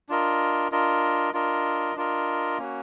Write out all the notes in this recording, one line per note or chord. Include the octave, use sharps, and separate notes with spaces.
D4 F4 A#4 D#5
D4 F4 A#4 D#5
D4 F4 A#4 D#5
D4 F4 A#4 D#5
A#3 C#4 F#4